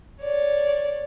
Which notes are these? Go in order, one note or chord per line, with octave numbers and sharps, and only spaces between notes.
C#5 D5